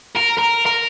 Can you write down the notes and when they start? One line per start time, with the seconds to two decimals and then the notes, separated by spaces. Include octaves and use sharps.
0.15 A#4
0.37 A#4
0.66 A#4